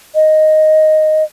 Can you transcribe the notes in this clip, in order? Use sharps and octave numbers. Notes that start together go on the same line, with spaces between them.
D#5